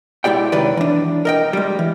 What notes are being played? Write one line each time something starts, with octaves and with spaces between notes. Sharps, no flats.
G#3 E4 G4 D5 G5
C2 F#2 D#3 B4 D5
E3 D4
A#4 D#5 G5
G3 G#3
E3